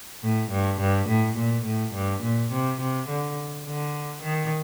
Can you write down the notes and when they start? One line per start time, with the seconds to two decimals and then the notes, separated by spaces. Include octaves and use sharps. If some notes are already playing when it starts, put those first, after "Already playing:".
0.23 A2
0.51 G2
0.80 G2
1.08 A2
1.38 A#2
1.65 A2
1.94 G2
2.22 A#2
2.52 C3
2.81 C3
3.09 D3
3.66 D3
4.23 D#3